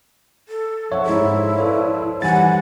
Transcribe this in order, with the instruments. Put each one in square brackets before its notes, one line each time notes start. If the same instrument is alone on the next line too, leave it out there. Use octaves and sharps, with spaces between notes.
[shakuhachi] A4
[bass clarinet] F3 [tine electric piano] C#5 [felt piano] E5 F#5
[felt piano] G#2 A4 [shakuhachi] E4
[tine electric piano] A4 C#5 [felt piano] B4 D5 F5
[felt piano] D#3 G3 [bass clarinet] E3 [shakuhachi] F#5 [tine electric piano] G#5 A6